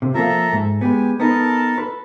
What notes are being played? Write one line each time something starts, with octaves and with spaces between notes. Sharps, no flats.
C3
F3 A#3 A4 E5 A#5
G#2
G#3 B3 G4 G#5
B3 D#4 A4 A#4 A5
B4